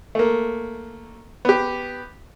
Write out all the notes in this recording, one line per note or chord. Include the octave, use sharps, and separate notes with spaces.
A3 A#3
B3 G4